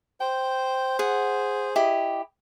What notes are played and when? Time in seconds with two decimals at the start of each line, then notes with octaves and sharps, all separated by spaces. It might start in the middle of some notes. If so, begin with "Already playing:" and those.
0.20 C5 G5
0.99 G#4 F#5
1.76 E4 G4 D#5